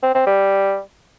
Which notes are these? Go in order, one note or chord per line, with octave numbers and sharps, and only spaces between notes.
C4
C4
G3